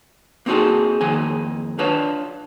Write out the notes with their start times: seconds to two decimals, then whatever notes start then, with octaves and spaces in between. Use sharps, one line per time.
0.46 A#3 C4 D#4 F#4 G#4 A4
1.01 F2 D#3 A#3 G#5
1.79 D4 F4 B4 C#5 F5 A5